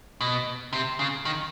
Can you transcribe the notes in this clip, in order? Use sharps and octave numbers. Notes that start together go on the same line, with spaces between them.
B2
C3
C#3
D#3